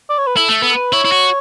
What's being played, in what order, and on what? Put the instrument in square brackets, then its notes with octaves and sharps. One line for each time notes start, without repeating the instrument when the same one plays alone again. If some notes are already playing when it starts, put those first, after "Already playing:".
[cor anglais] D5
C#5
B4
[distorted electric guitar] E4 [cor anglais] A4
[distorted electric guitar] A3
B3
[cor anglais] A4
B4
[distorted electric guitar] E4 [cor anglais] C#5
[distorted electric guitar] E4
F#4